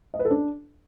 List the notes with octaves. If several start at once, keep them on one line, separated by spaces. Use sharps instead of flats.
D#5
B4
A4
D4